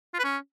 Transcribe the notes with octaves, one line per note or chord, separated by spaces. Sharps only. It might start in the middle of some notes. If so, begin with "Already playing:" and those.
F4
B4
C#4